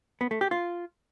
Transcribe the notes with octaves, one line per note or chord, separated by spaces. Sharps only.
B3
A3
G4
F4